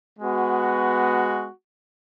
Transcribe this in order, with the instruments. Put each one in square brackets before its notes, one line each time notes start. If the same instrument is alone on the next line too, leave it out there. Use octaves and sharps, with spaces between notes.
[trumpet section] G#3 B3 F#4